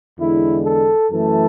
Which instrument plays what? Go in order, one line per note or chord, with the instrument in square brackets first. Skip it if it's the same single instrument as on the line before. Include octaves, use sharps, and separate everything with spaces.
[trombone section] E2 D3 G#3 E4
A4
F#2 E3 A3 A4